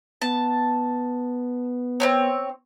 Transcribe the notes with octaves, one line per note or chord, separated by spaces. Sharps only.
B3 A5
C4 C#4 C#5